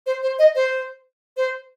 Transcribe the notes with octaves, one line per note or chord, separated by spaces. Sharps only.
C5
C5
D#5
C5
C5